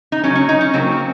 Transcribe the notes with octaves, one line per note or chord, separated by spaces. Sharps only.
D#4
C#3 F#3 A#3 C#4
C#4
D#4
C#4
C#3 F#3 A#3 C4